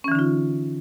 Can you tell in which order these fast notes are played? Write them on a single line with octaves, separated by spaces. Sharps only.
C#4 E3 D3 D#4 F4